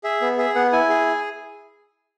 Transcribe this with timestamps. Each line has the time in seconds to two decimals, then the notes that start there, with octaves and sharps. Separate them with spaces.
0.04 G#4 E5
0.21 B3
0.38 G#4 E5
0.55 B3 F#5
0.72 E4 G#5
0.89 G#4